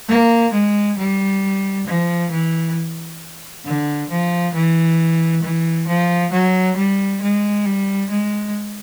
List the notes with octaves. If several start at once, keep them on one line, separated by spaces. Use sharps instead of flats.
A#3
G#3
G3
F3
E3
D3
F3
E3
E3
F3
F#3
G3
G#3
G3
G#3